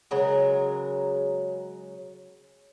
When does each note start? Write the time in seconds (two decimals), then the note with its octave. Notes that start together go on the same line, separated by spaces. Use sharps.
0.11 C#3 F#3 G#3 A#4